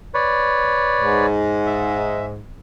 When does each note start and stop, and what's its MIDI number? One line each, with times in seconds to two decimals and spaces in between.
0.14 1.26 71
0.14 1.26 73
0.14 1.26 74
1.00 2.41 44
1.67 2.26 76